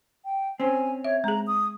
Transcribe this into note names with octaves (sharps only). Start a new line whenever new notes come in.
G5
C4 C#4 G#5
C#5 E5
G#3 G#4 A#5
D#6